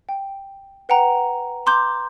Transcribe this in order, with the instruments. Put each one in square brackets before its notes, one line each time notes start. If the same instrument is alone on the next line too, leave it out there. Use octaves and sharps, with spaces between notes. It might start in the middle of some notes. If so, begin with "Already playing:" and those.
[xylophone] G5
B4 F#5 G5 A#5
A#5 C6 D6 G6